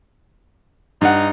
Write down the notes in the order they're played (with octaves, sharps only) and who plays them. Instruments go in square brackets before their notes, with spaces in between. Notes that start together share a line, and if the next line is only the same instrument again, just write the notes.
[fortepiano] G2 F#5 [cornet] D#4